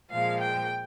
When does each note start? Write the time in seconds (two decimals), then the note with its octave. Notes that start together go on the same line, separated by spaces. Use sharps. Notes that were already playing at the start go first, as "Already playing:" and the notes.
0.11 A#2 F3 G#3 F5
0.41 G5